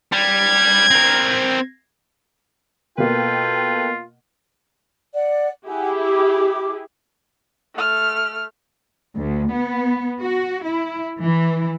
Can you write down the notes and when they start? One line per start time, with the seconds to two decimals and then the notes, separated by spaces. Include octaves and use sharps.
0.12 G3 G#6
0.91 C4 A#4
2.98 B2 A#3 F4 A4 B4 G5
5.13 D5 F#5
5.67 E4 G4 G#4 F#5 G#5
6.01 D6
7.75 A3 F6
9.15 D2
9.50 B3
10.21 F#4
10.65 E4
11.21 E3